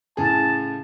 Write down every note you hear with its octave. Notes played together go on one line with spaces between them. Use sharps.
A2 C#3 G#4 A5